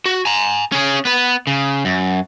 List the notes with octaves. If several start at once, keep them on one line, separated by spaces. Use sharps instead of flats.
F#4
G#5 A#5
C#4 G#4
B3 B4
C#3
F#2